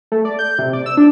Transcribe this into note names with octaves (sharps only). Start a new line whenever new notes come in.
A3
D5
G6
C3
D5
E6
D4